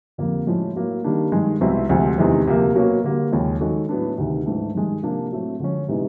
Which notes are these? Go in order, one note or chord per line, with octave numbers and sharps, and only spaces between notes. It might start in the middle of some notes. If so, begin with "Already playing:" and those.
F2 D3 G3 A#3
A2 F3 G#3 C#4 F#4
A2 F#3 A#3
D#3 G3 A#3 D4
G2 D#3 G#3
C2 B2 G#3 C4 E4
D2 C3 F3 G#3 C4
E2 C3 D#3 G#3 C4
D2 C3 F3 A#3
B2 F#3 A#3 C#4
D3 G3 A#3
D#2 C#3 F3 G#3
D#3 G#3 C#4 F#4 A4
A2 F#3 B3 D4
D2 C3 D#3
G#2 E3 A3 D4
G2 D#3 G#3
C3 F3 A#3 D4
A2 F#3 A3 C4
D3 F3 G#3 C#4
C3 E3 G#3 B3 D#4